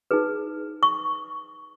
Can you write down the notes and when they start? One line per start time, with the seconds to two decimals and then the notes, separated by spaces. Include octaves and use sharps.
0.11 D#4 G#4 B4
0.83 C#6